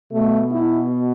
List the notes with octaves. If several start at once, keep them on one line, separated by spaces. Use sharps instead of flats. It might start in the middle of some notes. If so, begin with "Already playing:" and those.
B2 A3
E4